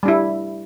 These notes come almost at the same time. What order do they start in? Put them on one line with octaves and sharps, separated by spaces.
G3 D4 E4